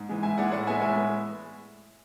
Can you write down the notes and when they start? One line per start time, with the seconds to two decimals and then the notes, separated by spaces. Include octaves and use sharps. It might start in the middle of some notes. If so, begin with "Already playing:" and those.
Already playing: G#2
0.09 E3 G#3
0.23 G#2 E5 G#5
0.38 E3 G#3 D5 F#5
0.52 A2 D5 F#5
0.67 G#3 B3 E5 G#5
0.82 A2 E5 G#5
0.96 G#3 B3